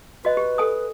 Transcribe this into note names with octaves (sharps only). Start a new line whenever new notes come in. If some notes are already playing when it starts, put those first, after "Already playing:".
F#4 B4 D#5
G4
A4 G#5 D#6